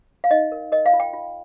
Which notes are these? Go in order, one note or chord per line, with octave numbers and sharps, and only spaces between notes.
F5
D#4 D#5
A#4
A#4 D#5
F5
F4
G5
F4